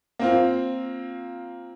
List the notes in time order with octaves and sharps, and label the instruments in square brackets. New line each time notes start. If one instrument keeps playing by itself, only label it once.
[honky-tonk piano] A#3 C4 F4